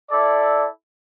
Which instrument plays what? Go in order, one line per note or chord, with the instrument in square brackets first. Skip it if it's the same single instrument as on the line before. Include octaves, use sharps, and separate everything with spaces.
[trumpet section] E4 A4 D5